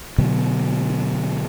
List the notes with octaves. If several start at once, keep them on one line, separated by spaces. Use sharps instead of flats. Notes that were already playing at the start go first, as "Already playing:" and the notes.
B2 D3 F#3 B3